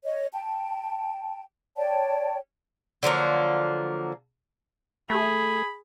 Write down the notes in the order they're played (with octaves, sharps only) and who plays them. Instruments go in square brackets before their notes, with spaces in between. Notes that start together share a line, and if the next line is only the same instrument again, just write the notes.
[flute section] C#5 D#5
G5 A5
C#5 D5 G5 A5
[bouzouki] D3 F3 F#3 A#3
[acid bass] A3 [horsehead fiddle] G#4 [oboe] B5